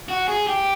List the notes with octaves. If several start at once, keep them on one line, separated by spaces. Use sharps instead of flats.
F#4
G#4
G4